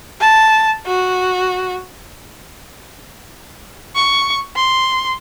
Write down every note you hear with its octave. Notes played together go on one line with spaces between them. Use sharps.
A5
F#4
C#6
C6